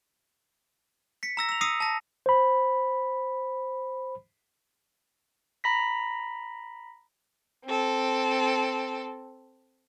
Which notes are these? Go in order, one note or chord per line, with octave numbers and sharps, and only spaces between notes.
B6 C#7
A#5 E6 A#6
E6 F7
D#6 E6 A#6 C7 C#7 D#7
A5 A#6
C5 B5
A#5 B5 A#6 B6
C4 A4